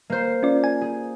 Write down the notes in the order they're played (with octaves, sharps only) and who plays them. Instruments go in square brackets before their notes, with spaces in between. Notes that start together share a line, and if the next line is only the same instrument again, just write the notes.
[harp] A#3 C5
[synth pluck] C#4 F4 D5
G#5
[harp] G#4